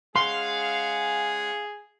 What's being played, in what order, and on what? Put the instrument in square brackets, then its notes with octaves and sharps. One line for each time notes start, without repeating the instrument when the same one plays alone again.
[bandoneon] G#3 C#4 F#5 [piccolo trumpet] G#4 [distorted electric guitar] F5 [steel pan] C6